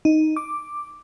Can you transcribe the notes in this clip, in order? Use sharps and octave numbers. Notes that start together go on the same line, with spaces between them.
D#4
D6